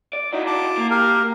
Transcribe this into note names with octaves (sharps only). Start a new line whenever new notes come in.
D5
D#4 E4 F#4
A5 D6
A#3
G4 A#4 F5